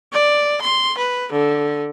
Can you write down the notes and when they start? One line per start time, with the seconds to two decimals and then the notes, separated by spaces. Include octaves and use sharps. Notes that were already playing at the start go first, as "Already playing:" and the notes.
0.12 D5
0.62 C6
0.98 B4
1.32 D3